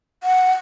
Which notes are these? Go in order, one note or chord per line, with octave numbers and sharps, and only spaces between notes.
F#5